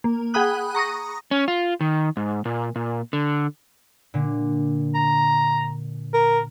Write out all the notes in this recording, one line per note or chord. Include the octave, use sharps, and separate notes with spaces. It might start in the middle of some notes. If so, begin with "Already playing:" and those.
A#3
G#4 F#5 G5 B5 D#6 F#6
A#5 C#6 D#6 A#6
C#4
F4
D#3
G#2
A#2
A#2
D3
A#2 D3
A#5
A#4